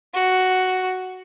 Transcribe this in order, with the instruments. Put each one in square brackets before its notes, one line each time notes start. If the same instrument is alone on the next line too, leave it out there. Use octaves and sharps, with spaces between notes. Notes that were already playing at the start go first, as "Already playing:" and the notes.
[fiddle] F#4